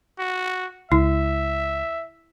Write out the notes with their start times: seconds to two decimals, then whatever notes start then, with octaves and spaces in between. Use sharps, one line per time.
0.19 F#4
0.92 C#2 E4 E5